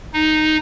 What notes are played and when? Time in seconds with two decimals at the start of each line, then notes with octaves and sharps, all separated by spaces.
0.13 D#4